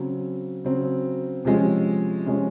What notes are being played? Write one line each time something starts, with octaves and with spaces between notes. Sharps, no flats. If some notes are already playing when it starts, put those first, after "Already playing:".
Already playing: C#3 F#3 C4
C#3 F#3 C4
C3 F3 G#3 C#4
C3 F3 G#3 C#4